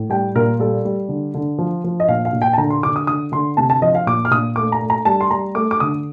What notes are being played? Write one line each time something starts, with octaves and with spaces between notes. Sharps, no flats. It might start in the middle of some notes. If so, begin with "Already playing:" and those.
Already playing: A2
G3 G5
A#2 A#4
G3 A4
G3
D3
D3
F3
F3
D#5
A#2 F5
F5
A#2
G5
A5
D3 A#5
C6
D3 D6
D#6
D3 D#6
D3 C6
C3 A5
A5
F3 D#5
F5
A#2 D6
F6
A#2 D#6
A3 D6
A#5
A3
A#5
G3 A5
C6
G3 A#5
A3 D6
D6
D3 D#6